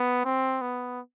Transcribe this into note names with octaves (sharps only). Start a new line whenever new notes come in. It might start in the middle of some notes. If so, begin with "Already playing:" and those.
Already playing: B3
C4
B3